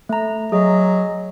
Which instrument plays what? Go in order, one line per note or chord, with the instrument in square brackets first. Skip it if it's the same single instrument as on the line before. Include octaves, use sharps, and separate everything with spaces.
[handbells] A3 A#5
[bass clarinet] F#3 [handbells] G#4 D#5